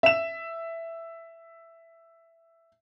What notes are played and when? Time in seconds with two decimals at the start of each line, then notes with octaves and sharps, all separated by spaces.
0.03 E5 E7